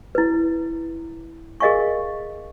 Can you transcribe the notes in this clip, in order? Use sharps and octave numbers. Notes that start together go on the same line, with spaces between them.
E4 B4
G#4 A#4 D#5 F5 G#5 C#6